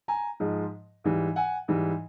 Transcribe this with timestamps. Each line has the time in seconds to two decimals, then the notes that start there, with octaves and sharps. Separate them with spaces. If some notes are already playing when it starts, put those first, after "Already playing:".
0.08 G#5 A#5
0.40 G#2 F3 G#3
1.04 G#2 E3 G3
1.36 F#5 G#5
1.68 G#2 E3 G3